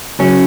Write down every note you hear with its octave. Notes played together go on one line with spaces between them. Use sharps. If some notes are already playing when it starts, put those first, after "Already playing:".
C#3 F#3 C#4